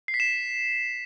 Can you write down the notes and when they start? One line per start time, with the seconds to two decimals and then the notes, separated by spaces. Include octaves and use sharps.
0.08 C7
0.14 B6
0.20 E7